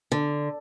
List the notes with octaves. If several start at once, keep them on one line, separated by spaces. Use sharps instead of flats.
D3